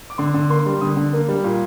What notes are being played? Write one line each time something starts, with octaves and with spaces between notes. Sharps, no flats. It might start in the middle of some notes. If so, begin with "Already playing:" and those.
D6
D3 C6
D3
A#3 C6
G3
D3 D#6
D3
A#3
G3
A#2